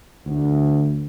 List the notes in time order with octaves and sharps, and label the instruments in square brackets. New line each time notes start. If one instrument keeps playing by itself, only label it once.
[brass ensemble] D2